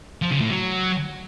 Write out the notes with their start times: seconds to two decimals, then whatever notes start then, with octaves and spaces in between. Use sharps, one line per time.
0.22 F3
0.31 C#3
0.40 A2
0.50 F#3